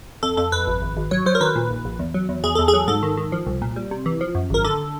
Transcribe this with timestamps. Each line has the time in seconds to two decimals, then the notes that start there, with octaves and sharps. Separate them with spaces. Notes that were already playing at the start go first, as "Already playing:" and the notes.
0.23 F2 A4
0.37 F2 A4
0.52 F2 B4
0.67 G#1
0.82 G#1
0.97 G#1
1.11 F#3 C#5
1.26 F#3 C5
1.35 A#4
1.41 D#3 B4
1.56 A#2
1.70 A#1
1.85 A#1
1.99 E2
2.14 F#3
2.29 E2
2.44 E2 G#4
2.55 E2 A4
2.68 G#4
2.73 F#3
2.88 G#2 A4
3.03 D#3
3.17 D#3
3.32 F3
3.47 C2
3.62 A#2
3.76 G3
3.91 C3
4.06 E3
4.21 F3
4.35 F#2
4.50 G#1 A#4
4.64 D3 A4